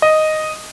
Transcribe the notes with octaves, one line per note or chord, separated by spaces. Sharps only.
D#5